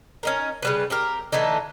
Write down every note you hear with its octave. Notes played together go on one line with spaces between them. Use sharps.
C#4 D#4 A#4
C#3 G3 B4
C4 G4 A#4
D3 E3 A3 D#4